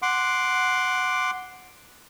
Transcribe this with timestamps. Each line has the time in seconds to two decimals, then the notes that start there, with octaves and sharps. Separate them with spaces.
0.02 F#5 C6 D6